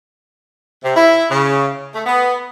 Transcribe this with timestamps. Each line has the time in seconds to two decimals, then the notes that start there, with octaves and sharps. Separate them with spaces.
0.84 C3
0.96 E4
1.30 C#3
1.95 A3
2.06 B3